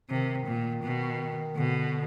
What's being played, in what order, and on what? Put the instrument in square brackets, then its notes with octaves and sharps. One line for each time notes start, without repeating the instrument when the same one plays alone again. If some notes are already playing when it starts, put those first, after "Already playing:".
[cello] C3 [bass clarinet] D#3
[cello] A#2
B2
[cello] B2 [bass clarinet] D3